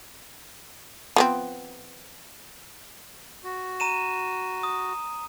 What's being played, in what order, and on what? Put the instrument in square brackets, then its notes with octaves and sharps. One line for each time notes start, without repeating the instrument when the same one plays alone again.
[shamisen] F3 B3 C4
[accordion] F#4
[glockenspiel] A#5 D#7 E7
D#6